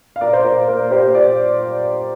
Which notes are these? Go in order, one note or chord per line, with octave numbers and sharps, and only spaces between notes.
F5
A#2 A#4 D5
C5
A#2 A#4
A#3 A#4
A#3 G4 C5
A#2 D5